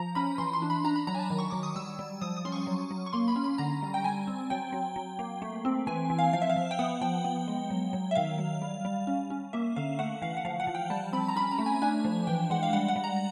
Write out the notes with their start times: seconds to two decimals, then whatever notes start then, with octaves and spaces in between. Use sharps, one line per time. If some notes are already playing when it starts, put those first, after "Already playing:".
Already playing: F3 A#5
0.15 C#4 B5
0.38 E3 C6
0.53 C6
0.62 D4
0.70 B5
0.84 D4 A#5
0.96 B5
1.07 F#3 A#5
1.15 G#5
1.19 A5
1.30 D#3
1.39 C#6
1.50 F#3 D6
1.63 D#6
1.75 G3 E6
1.99 G3
2.21 F3 D#6
2.37 D#6
2.45 C#4 C6
2.52 C#6
2.67 F#3
2.91 F#3
3.06 C#6
3.13 A#3 C6
3.28 B5
3.36 C#4
3.44 B5
3.58 D3 A#5
3.82 G3
3.94 G5
4.04 G3 G#5
4.27 C4
4.50 F#3 G5
4.73 F#3
4.96 F#3
5.19 A#3
5.42 A3
5.65 C4
5.87 E3 G#5
6.10 E3
6.19 F5
6.33 F3 F5
6.42 E5
6.50 F5
6.56 F3
6.71 G5
6.79 B3 F#5
7.01 F3 G5
7.24 B3
7.48 G#3
7.70 F#3
7.93 F#3
8.11 E5
8.15 D#3 F5
8.38 F#3
8.62 G3
8.85 G3
9.07 C#4
9.30 C#4
9.53 A#3 E5
9.76 D3 F5
9.99 A3 F#5
10.22 E3 F5
10.37 F#5
10.45 F3 F5
10.60 F#5
10.67 F3
10.75 G5
10.90 G3 A5
11.13 C4 B5
11.29 A#5
11.36 C#4 B5
11.51 A#5
11.59 A3
11.66 G#5
11.82 D4 G#5
12.05 F3
12.27 E3 G5
12.50 G#3 F#5
12.63 F5
12.73 G3 F#5
12.88 F#5
12.96 G3
13.04 A#5